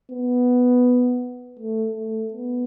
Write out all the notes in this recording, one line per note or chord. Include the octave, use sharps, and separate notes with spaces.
B3
A3
A3
B3